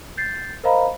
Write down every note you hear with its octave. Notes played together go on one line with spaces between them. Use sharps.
G6 A6 C7
A#4 C5 D#5 F5 A#5 B5